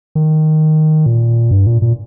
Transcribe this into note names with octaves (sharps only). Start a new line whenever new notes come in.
D#3
A#2
G2
A#2
A#2